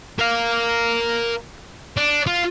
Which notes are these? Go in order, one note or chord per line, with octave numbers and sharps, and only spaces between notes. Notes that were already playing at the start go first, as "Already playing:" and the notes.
A#4 F5
D4
F4